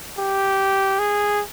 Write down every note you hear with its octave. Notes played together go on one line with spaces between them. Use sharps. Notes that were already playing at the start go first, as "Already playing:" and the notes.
G4
G#4